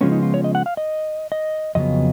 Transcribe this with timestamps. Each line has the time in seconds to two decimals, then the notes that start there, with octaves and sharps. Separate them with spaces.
0.01 C#3 F3 G#3 B3 C#4
0.12 D#4
0.23 F4
0.34 C#5
0.44 D#5
0.55 F#5
0.66 F5
0.77 D#5
1.32 D#5
1.75 F2 C#3 F#3 B3 D#5